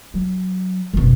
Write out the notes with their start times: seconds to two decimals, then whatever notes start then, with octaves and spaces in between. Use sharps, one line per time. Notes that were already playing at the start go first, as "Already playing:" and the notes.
0.14 F#3
0.94 F#1 B2